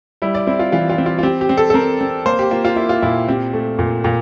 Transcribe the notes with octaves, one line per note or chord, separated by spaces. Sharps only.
G3 E4
D5
C4 E4
F4
E3 F4
F4
C4
F4
F4
C4 G4
G4
C4
A4
A4
C4 A#4
C4
A#3 C5
G4
A#3 F4
F4
A#3 E4
F4
A#2 E4
C4 G4
A3
A#2
A#2